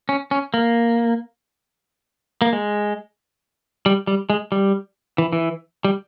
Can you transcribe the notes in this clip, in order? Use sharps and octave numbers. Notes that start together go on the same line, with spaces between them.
C#4
C#4
A#3
A#3
G#3
G3
G3
G#3
G3
E3
E3
G3